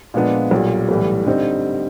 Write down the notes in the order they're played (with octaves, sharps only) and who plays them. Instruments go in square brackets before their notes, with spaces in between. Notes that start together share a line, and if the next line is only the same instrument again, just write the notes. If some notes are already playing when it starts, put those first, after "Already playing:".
[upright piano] A#2 F3 G#3 B3 D4
B1 A#2 G3
B1 A2 E3 G3
D3 G3 C4 D#4